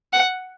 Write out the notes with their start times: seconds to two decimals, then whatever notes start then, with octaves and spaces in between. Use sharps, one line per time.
0.13 F#5